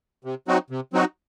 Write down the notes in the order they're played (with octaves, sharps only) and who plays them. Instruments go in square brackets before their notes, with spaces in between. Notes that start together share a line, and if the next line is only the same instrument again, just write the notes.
[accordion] C3
F#3 C4 D#4 F#4
C3
F#3 C4 D#4 F#4